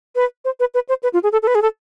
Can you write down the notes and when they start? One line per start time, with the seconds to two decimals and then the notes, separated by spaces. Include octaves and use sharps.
0.16 B4
0.45 C5
0.60 B4
0.74 B4
0.89 C5
1.03 B4
1.13 F4
1.23 G#4
1.32 A4
1.43 A4
1.47 B4
1.55 G#4
1.62 A4